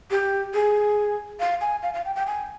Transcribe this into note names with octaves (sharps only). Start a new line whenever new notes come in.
G4
G#4
F5
G#5
F5
F5
G5
G5
G#5